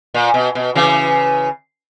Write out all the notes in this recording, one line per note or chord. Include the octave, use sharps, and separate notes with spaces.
A#2
B2
B2
C#3 E3